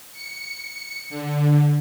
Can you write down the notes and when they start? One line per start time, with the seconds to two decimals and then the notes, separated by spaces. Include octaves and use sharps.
0.12 C#7
1.10 D3